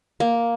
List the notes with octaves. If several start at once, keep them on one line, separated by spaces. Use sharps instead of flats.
A#3